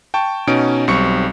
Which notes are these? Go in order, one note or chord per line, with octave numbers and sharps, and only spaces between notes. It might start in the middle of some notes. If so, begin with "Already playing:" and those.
G5 A5 C#6
B2 C#4 D#4 D7
B1 G3 C4 C#6 C#7